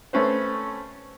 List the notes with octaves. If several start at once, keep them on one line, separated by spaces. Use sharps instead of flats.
A3 C4 C#4 B4 C5